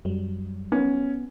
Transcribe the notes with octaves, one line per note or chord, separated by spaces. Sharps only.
F#2 F#3 G3
B3 C#4